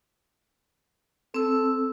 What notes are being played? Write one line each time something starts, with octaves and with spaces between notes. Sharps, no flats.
C4 A4 E6